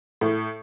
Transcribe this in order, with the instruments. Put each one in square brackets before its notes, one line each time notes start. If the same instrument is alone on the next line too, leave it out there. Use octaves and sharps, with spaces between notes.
[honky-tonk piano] A2